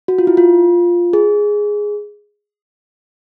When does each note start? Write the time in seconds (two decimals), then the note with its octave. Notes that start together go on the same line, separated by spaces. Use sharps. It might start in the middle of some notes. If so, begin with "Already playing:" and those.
0.08 F#4
0.19 F4
0.27 E4
0.37 F4
1.13 G#4